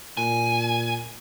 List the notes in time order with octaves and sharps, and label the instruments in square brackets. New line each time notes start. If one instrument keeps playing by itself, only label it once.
[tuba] A#2 [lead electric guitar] G#5